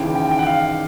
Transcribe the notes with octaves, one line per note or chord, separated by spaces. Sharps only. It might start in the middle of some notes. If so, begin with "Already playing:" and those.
Already playing: D#2 C#3 E3 G5
G5
G5
F#5
F5